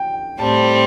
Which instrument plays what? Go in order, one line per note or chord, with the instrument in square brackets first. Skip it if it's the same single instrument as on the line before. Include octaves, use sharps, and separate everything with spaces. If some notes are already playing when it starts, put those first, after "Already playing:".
Already playing: [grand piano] G5
[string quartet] A2 G3 C4 [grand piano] A5